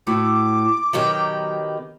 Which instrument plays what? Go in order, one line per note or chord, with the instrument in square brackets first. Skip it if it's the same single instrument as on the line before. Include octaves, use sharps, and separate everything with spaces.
[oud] A2 E4 F#4 [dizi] D6
[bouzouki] B2 D#3 G4 [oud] F#3